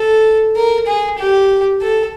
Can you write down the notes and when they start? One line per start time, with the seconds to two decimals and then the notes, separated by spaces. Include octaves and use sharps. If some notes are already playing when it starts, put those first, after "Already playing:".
Already playing: A4
0.56 A#4
0.87 G#4
1.18 G4
1.82 A4